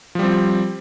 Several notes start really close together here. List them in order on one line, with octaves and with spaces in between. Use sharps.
F3 G3 C4